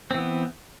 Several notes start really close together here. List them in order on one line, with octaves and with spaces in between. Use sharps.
C4 E3 B3